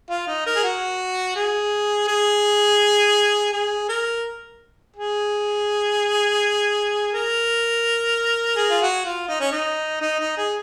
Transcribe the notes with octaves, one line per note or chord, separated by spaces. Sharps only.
F4
D#4
A#4
G#4
F#4
G#4
G#4
G#4
A#4
G#4
A#4
G#4
F4
F#4
F4
D#4
C#4
D#4
D#4
D#4
G#4